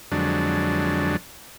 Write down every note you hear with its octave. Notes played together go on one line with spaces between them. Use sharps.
F2 D3 F#3 G#3 D4